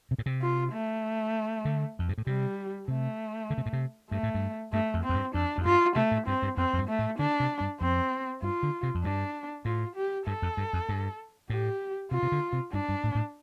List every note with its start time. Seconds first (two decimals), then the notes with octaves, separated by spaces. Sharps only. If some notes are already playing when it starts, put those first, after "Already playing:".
0.11 C3
0.18 A2
0.26 C3
0.42 F4
0.73 A3
1.65 D3
1.99 F2
2.09 G2
2.18 A2
2.27 C3 G3
2.88 C3 A3
3.50 D3
3.58 C3
3.66 A2
3.73 C3
4.11 G2 A3
4.23 A2
4.34 G2
4.73 G2 A3
4.94 F2
5.04 C4
5.09 F2
5.14 G2
5.34 F2 D4
5.58 F2
5.65 G2 F4
5.96 C3 A3
6.11 A2
6.27 G2 C4
6.42 G2
6.57 F2 C4
6.73 F2
6.78 G2
6.88 A3
6.99 A2
7.19 D3 D4
7.40 C3
7.60 G2
7.81 F2 C4
8.42 G2 F4
8.63 D3
8.83 C3
8.95 F2
9.04 G2 D4
9.65 A2 F4
9.96 G4
10.27 G2 A4
10.42 F2
10.57 G2
10.73 F2
10.89 G2
11.50 A2 G4
12.11 C3 F4
12.23 C3
12.32 D3
12.53 C3
12.73 G2 D4
12.89 G2
13.04 A2
13.15 A2